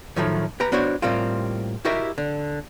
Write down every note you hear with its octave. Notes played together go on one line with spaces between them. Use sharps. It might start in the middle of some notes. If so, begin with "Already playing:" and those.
A2 D#3 F3 F#3 A3
G4 B4 A#5
B3 D4 F#4 C5 C#5
A2 G3 A#3 C4 F4
E4 F#4 G4 A#4 D#5 E5
D3